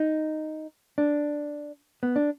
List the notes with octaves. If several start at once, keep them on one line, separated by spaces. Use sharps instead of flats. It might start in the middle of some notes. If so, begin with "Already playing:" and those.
Already playing: D#4
D4
B3
D4